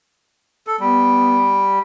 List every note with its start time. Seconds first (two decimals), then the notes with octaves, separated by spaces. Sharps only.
0.67 A4
0.80 G3 B3